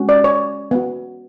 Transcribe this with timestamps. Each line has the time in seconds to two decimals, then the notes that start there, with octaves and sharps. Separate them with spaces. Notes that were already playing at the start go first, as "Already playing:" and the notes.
Already playing: G#3 C#4 F#4
0.09 D5
0.24 C#5
0.71 B3 F#4